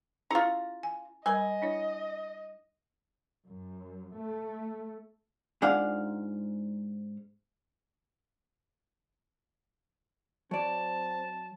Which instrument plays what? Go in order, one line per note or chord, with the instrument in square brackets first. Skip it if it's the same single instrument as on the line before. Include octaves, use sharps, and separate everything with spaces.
[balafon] C#4 E4 G#4 [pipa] F4 A#5
[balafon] G#5
[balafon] G3 A#4 B5 [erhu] D#5 [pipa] G#5
[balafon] D4 E4 C#5
[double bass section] F#2
A3
[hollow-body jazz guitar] G#2 G#3 D4 F4 F5 F#5
[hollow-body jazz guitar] F#3 D5 [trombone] C4 [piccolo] A5